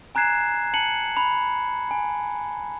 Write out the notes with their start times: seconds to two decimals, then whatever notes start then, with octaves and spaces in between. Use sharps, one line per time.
0.15 G#5 A#5 F#6 G#6 C7 E7
0.74 A5 C#7 F#7
1.17 B5
1.91 G#5